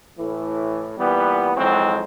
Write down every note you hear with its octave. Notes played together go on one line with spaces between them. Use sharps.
A2 E3
A#2 E3 G3 B3
F2 G#2 E3 F#3 G#3 C4